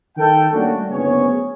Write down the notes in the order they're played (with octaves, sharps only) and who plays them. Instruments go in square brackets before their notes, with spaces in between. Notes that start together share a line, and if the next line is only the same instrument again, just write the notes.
[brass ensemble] D#3 A4 G5
G3 A3 A#3 C#4 D4 F#4
F#1 D2 B3 C#4 G#4 C#5